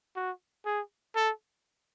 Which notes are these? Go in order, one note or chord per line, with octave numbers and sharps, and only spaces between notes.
F#4
G#4
A4